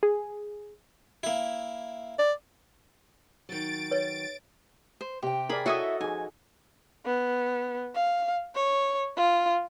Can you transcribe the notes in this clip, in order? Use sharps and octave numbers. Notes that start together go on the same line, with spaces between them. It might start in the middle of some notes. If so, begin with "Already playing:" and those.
G#4
A#3 E4
D5
D#3 F#3 A6 D7
B4 C#5
C5
C3 G4 G5
G#4 A#4 D5 B5
E4 F#4 A4 C#5 D#5 E5 D#6
F3 D#4 G#4 G#5
B3
F5
C#5
F4